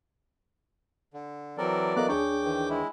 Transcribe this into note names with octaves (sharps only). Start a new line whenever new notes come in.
D3
E3 F#3 C4 A4 A#4 D5
B3 A4 A#4 D#5 F5 A#5 D6 F#6
D2 D4 G#4 C#5 G5 C#6 D6
D#3 E3
G#3 E4